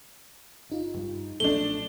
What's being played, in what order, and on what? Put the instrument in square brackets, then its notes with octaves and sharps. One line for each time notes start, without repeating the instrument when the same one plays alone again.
[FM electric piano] G1 D#4 F4
[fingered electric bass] G2 G3
[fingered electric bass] B1 A#2 F3 [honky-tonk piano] A3 D4 [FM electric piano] A4 [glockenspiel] G7